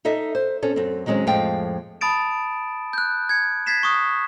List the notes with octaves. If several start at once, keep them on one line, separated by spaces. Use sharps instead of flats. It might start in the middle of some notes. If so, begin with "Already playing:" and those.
D#4 A4 D#5 E5
C5
C4 C#4 A4
F#2 C4
D#3 F#3 G#3 C4 C#4
F2 A2 F3 G#3 F5 G5
A5 B5 D#6 A6 D7 E7
F#6 G6
G#6 C#7
G#6 A6 B6 C7 E7
C#6 D#6 F#6